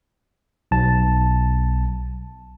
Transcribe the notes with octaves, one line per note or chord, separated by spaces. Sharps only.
B1 A5